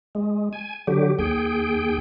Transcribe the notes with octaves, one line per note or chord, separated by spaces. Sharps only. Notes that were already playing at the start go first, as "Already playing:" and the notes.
G#3
G#5
D3 F#3 G4
D#2 G#4 G5